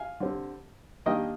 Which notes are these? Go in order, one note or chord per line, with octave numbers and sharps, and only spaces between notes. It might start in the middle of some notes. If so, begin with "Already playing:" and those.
Already playing: F5 G#5
D3 G3 C4
D#3 G3 A#3 D4 D#5 G5